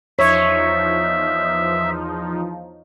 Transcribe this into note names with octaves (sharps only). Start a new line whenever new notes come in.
E2 F3 D#4 C#5 E5